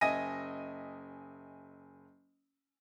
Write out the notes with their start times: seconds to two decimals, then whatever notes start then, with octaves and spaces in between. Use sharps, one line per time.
0.01 F#1 D#5 E5 G#5 A#6 D#7